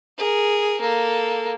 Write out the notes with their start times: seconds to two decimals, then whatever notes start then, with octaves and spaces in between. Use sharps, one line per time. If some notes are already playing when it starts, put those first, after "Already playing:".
0.18 G#4 A#4
0.81 A#3 A4